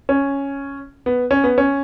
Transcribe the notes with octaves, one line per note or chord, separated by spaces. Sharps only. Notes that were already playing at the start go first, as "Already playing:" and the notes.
C#4
B3
C#4
B3
C#4